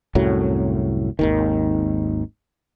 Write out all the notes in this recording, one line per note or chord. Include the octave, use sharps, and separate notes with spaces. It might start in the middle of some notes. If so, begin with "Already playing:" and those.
C2 F#2 A2 F#3
G#1 D#2 D#3